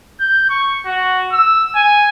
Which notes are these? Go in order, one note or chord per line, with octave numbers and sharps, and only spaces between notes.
G6
C#6
F#4
E6
G#5